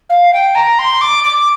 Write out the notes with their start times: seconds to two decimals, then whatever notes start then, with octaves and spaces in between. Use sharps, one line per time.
0.10 F5
0.33 G5
0.55 A#5
0.79 C6
1.01 D6
1.24 D6